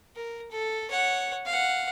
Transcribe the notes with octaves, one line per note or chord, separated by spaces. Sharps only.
A#4
A4
C#5 F#5
F5 F#5